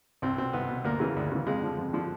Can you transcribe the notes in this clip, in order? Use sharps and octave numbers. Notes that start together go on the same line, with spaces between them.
C2 C4
B2 C4
C2 B3
B2
D2 A#3
C#3 E3
D2
C#3 E3
F2 G#3
D3 F3
F2
D3 F3